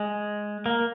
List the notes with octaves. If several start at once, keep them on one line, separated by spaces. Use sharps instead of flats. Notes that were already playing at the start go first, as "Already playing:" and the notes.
Already playing: G#3
A#3